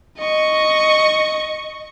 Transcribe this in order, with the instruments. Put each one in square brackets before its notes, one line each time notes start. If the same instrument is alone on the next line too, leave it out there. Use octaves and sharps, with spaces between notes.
[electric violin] D#5 C#6